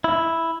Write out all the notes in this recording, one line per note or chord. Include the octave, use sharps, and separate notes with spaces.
E4